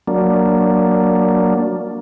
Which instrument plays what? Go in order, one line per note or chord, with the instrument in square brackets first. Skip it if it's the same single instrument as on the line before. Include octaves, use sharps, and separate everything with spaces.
[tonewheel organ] F#3 A#3 D4